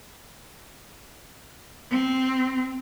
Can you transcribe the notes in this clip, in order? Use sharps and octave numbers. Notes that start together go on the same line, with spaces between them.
C4